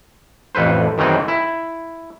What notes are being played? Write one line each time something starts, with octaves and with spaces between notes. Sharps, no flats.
A1 F2 A4 B4 C5
F#2 D#3 E3 G#3 C4 D#4
E4